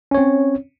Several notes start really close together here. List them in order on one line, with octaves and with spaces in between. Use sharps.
C#4 C#5 C4